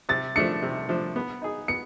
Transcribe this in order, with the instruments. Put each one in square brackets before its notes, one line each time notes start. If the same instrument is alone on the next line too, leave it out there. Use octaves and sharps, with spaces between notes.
[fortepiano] C3 [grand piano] A6
[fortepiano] F3 A3 D4 [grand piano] C#7
[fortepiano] C3
F3 A3 D4
B3
D#4 G#4
[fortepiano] B3 [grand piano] C#7